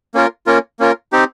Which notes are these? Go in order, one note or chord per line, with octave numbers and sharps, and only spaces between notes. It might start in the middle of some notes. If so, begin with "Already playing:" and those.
A#3 C#4 F4 A#4
A#3 C#4 F4 A#4
A#3 C#4 F4 A#4
C4 D#4 G4